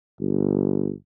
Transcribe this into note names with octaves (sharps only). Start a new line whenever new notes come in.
G1